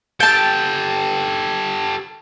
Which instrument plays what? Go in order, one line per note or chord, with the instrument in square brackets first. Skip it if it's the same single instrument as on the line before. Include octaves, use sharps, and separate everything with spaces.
[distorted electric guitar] G4 A4 [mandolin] G5 A5